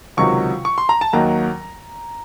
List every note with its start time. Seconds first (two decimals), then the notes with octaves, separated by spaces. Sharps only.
0.17 C#2 C3 D#3 F#3 C#6
0.65 C#6
0.78 C6
0.89 A#5
1.01 A5
1.13 D#2 D#3 F#3 A#5